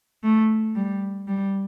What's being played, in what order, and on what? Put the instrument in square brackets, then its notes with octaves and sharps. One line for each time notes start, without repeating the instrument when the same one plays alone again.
[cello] A3
G3
G3